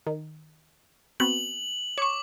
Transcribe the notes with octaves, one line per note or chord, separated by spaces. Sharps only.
D#3
B3 C4 F#4 F#7
C#5 C#6 D6